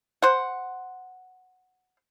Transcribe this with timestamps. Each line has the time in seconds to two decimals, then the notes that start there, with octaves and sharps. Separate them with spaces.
0.22 C5 F#5